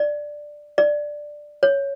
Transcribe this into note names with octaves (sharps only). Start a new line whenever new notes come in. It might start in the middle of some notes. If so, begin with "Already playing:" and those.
Already playing: D5
D5
C#5